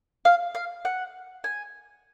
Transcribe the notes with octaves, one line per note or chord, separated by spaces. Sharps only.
F5
F5
F#5
G#5